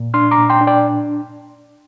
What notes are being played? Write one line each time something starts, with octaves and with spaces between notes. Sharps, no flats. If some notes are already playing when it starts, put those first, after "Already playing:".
Already playing: A#2
D4 C6 F6
A#5 D6
A#2
G5 C6
D4
D5 G5